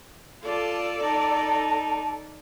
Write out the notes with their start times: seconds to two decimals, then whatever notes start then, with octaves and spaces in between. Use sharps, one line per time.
0.43 F4 A4 D5 A5
1.03 D#4 A5